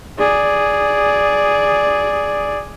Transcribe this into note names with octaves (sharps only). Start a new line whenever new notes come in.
G#4 D5